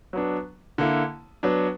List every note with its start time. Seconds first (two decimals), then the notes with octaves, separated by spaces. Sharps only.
0.13 F#3 B3 D4
0.78 D3 A#3 E4
1.43 F#3 B3 D4